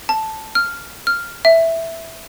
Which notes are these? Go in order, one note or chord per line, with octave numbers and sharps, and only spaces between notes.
A5
F6
F6
E5